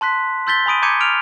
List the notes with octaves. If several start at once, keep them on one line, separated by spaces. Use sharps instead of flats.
A5 C6 F#6 B6
C6 E6 G6 A6 B6 G7
G#5 B5 D#6 D7 D#7
A#5 D6 G6 G#6 C#7 D#7
F6 D7 F7